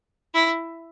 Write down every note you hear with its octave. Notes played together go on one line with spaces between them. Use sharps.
E4